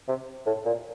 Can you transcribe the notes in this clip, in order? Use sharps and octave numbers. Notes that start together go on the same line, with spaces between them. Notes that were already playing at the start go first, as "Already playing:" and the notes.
C3
A2
A#2